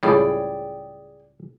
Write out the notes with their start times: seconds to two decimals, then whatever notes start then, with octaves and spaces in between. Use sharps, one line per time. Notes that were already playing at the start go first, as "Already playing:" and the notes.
0.03 C#2 A2 G3 G#4 D5 G5